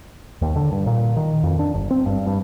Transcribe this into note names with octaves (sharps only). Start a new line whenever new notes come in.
D#2
D3
G2
A#2
D#3
F2
D4
G1
C4
G2
G2